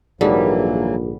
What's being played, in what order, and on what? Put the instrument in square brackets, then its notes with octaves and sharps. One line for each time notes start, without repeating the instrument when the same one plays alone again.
[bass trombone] A#1 [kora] G#2 D3 [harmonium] E3 F#3 A#3 [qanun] G3